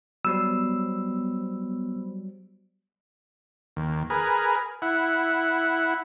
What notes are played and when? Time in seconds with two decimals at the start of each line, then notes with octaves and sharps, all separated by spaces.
0.25 F#3 G3 B3 C5 E6
3.77 D#2
4.10 G#4 A#4 B4
4.82 E4 F#5